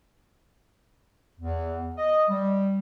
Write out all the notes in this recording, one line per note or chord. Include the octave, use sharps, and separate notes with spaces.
E2
D#5
G3